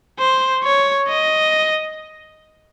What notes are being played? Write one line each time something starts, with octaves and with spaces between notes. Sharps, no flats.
C5
C#5
D#5